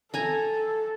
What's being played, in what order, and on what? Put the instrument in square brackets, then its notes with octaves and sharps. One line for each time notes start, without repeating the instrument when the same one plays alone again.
[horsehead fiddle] A4 [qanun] G#5 A#5